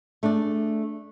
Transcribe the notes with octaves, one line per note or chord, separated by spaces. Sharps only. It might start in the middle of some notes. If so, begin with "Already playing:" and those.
A3 D4 G#4 D5